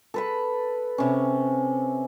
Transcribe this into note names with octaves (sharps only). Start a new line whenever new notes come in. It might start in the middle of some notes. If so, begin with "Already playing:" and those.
A4 B4 B5
C3 C#4